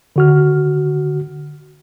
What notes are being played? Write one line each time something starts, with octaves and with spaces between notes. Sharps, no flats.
D3 F#4 F6